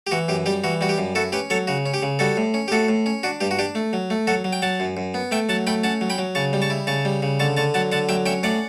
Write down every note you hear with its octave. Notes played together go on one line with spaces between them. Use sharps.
G4
E3 F#4
F#2 G4
G3 G4
E3 F#4
G3 F#4
G4
F#2
E4 F#4 A4
C#4 G4 B4
F#3 A4 C#5
C#3 F#4
C#4
G4
C#3
G3 F#4 A4
A2
C#4
G4
A2 F#4 A4
A2
C#4
D4 F#4
G2 G4
F#4
D4 G4
A3
F#3
A3
F#3 F#4 A4
F#3
G5
F#3 F#5 A5
F#2
F#2
B3
A3 E5 G5
F#3 F#5 A5
A3 G5 B5
C#4 F#5 A5
F#3
G5 B5
F#3
C#3 A5 C#6
G3
A5 C#6
E4
C#3 A5 C#6
G3
C#3
D3 A5 C#6
D3 A5 C#6
F#3 F#5 A5
D3 F#5 A5
F#3 E5 G5
C#4 E5 G5
A2 D5 F#5